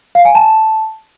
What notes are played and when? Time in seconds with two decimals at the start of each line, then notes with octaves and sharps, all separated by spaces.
0.15 F5
0.25 G#5
0.35 A5